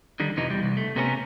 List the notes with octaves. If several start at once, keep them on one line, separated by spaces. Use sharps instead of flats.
D3 D#3 G3
F2 C3 E3 F3 D#4
E2 G3
C2
A3
C3 B3 C#4 F#4 A#4